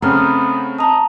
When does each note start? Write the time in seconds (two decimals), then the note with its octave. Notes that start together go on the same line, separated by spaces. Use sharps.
0.02 C#3 A3 B3 C4 A#5 F6
0.79 D#5 A5 A#5